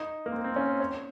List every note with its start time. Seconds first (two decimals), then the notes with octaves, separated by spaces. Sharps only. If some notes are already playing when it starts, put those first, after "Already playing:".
Already playing: D#4
0.26 A#3
0.32 C4
0.44 C4
0.56 C#4
0.69 C5
0.80 C#5